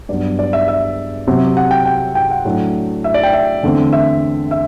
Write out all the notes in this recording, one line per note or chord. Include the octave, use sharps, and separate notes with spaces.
G2 F#3 B3 D5
D5
E5
E5
C3 F#3 C4
F#5
G5
G5
G5
F#5
A2 F#3 A3 D4
E5
D5
G5
E5
E2 D3 A3 C4
E5
E5